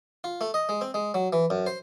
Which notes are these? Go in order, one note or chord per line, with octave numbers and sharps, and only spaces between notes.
F4
A3
D#5
G#3
C4
G#3
F#3
E3
F#2
C5